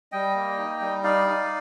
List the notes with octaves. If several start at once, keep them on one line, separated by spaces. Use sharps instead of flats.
G3 D#5 G5
A#3
D#4
G3
D#4 D5 F5
D#4